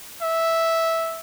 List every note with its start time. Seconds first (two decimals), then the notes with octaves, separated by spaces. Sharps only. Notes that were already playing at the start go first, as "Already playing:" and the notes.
0.22 E5